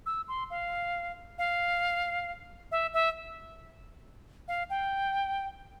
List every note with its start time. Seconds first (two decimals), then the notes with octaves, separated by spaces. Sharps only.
0.06 E6
0.28 C6
0.50 F5
1.38 F5
2.71 E5
2.94 E5
4.48 F5
4.70 G5